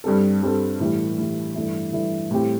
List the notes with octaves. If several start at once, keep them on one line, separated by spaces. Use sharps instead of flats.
G2 G3 C4 A4
G2 G3 C4 A4
A2 E3 G3
A2 E3 G3
G2 E3 A3 E4
G2 E3 A3 E4
A2 G3 C4 G4